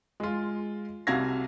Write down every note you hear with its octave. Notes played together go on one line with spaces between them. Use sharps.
G#3 F4
C2 C3 F#4 F5 G#6 A#6